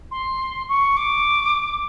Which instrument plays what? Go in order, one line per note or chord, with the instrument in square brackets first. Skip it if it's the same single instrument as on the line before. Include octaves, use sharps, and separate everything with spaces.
[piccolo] C6
C#6
D6